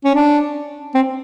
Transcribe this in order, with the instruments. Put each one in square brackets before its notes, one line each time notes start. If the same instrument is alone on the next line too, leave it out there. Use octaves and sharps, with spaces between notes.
[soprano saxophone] C#4
D4
C4